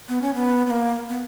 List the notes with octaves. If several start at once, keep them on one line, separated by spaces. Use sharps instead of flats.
B3
C#4
B3
B3
A#3
B3